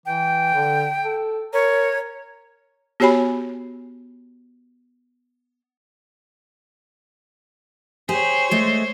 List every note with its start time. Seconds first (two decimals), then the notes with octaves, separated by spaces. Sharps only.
0.06 E3 G5
0.54 D3
1.05 A4
1.53 A#4 C#5
3.00 B3 F#4 G4 C#5 G#5 B5
8.09 G4 G#4 C5 C#5
8.51 G#3 A3